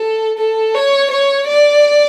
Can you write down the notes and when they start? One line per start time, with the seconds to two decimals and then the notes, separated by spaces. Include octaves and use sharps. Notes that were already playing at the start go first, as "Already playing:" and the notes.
Already playing: A4
0.38 A4
0.74 C#5
1.11 C#5
1.48 D5